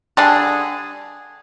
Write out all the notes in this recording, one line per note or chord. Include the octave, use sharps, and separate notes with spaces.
D3 G3 D4 G#4